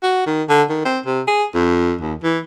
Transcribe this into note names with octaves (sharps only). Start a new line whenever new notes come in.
F#4
D#3
D3
D#3
C4
C3
G#4
F2
D#2
E3